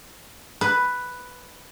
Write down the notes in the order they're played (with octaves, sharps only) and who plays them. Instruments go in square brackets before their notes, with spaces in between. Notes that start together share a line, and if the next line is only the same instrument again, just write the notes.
[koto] B4